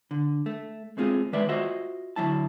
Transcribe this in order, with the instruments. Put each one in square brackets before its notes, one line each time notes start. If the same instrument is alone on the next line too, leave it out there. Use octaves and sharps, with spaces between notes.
[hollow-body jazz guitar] D3
A3
G#3 A3 C4 F4 G#4
D#3 G#3 B4 D5 E5
F4 F#4 C5 D#5 E5 F#5
D2 F#3 E4 A5